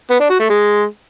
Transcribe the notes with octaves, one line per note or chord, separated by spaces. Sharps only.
B3
D4
F#4
A3
G#3